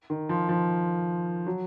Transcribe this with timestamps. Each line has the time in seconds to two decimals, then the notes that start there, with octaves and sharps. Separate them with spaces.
0.10 D#3
0.29 F3
0.49 F3
1.47 F#3